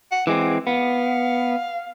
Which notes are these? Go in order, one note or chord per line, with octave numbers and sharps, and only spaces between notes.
F#5
E3 G#3 C4 D6
B3 F5